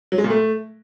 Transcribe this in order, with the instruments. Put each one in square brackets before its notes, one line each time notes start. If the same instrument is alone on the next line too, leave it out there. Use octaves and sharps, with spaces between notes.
[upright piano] F#3
G#3
A#2
A3